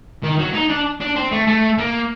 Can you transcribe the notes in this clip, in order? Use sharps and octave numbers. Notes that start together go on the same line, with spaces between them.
D#3
F#3
D#4
D4
D4
C4
A3
A3
A#3